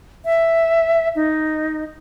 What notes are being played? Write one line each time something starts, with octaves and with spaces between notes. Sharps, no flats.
E5
D#4